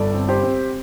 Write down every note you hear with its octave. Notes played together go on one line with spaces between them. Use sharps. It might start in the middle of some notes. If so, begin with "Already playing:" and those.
Already playing: G1 A4 D5
C4
G4 C5
C4